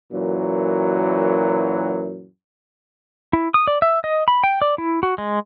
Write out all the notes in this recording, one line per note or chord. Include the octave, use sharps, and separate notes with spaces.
F#2 A#2 E3 F#3
E4
D#6
D5
E5
D#5
B5
G5
D5
E4
F#4
G#3